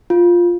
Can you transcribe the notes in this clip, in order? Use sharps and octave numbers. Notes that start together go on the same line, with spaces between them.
F4